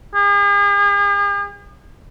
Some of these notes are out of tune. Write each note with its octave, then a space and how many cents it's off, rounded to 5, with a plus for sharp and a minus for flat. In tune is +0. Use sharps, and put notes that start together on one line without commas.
G#4 -45